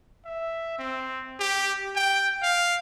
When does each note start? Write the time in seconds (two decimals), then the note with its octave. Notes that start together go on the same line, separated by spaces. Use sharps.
0.25 E5
0.79 C4
1.39 G4
1.95 G5
2.43 F5